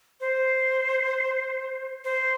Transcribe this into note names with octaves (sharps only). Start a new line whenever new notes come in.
C5
C5